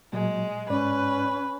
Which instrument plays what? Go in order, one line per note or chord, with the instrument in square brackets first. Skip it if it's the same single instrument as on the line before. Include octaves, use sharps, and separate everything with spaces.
[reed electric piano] A#2 F#3 [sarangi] G#3
[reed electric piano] G#2 D5 [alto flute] C#4 [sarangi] B4